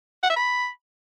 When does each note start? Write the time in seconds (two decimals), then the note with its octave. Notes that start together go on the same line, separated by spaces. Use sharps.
0.24 F#5
0.30 E5
0.36 B5